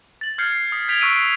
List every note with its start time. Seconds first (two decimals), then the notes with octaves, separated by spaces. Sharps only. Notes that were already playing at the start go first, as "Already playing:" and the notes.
0.21 A6 F#7
0.38 F6 G6 G#6 C7 C#7
0.72 D#6 B6
0.88 G6 G#6 B6 D7 F7 G7
1.01 C#6 D#6 E6 F#6 D7 D#7